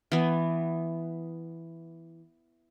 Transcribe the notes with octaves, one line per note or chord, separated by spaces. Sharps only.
E3 B3